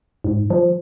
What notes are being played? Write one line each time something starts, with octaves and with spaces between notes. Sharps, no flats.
G#2
F3